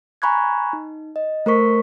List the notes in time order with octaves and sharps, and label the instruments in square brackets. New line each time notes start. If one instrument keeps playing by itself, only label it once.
[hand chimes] G#5 A#5 B5 C#6 F#6 G#6
D#4
D#5
A3 A#4 C5 C#6 B6